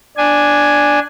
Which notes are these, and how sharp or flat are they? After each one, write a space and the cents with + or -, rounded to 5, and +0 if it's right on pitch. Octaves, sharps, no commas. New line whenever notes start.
D4 +0 G#5 +0